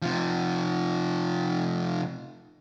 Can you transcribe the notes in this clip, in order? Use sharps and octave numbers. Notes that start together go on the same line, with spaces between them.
C3 F3